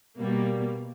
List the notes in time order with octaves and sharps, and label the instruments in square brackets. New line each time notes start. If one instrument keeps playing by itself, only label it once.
[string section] B2 G3 A#3